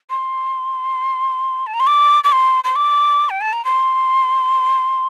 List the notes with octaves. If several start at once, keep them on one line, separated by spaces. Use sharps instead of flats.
C6
A5
A#5
C6
D6
D6
C6
C6
D6
G5
A5
A#5
C6